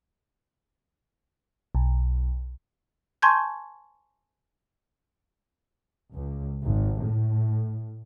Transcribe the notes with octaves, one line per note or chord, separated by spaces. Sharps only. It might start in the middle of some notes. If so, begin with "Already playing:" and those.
B1
G#5 A5 C6 C#6 G6 G#6
C#2
G#1
A2